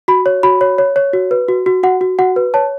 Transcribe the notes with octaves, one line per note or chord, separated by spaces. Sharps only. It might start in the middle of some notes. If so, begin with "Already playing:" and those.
F#4 B5
C#5
F#4 B5
C#5
C#5
C#5
F#4
B4
F#4
F#4
F#4 F#5
F#4
F#4 F#5
B4
C#5 A5